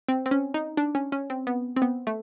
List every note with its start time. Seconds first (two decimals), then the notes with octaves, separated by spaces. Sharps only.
0.09 C4
0.26 C4
0.31 C#4
0.54 D#4
0.77 D4
0.95 C#4
1.12 C#4
1.30 C4
1.47 B3
1.76 C4
1.82 B3
2.07 A3